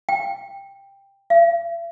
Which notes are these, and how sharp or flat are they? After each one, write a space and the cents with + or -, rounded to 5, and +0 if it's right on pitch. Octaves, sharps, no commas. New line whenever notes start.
G5 +10
E5 +45